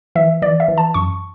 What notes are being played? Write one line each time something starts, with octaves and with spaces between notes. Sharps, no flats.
E3 E5
E3 D5
E5
E3
A5
F#2 C#6